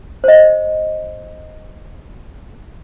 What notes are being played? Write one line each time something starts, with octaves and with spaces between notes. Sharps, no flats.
C5 D#5